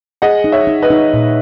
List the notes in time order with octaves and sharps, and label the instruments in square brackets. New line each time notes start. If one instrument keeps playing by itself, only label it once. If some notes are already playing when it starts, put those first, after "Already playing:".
[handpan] G#4 [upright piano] D#5 F#5
[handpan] D#4
[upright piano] C#5 E5
[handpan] D#4
[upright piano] B4 D#5
[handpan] D#4
A#2